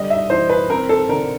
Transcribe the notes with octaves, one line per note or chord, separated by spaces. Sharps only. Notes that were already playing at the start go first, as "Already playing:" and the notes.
Already playing: D3 G3 D#5
E5
E3 C5
B4
C4 A#4
A4
D3 A#4